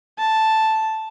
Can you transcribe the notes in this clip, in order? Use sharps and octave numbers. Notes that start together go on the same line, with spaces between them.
A5